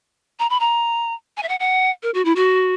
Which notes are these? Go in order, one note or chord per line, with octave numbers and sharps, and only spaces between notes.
A#5
B5
A#5
G#5
E5
F#5
F#5
A#4
F#4
E4
F#4